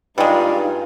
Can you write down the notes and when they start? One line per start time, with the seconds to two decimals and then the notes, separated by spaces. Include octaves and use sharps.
0.18 G2 G3 G#3 D#4 F4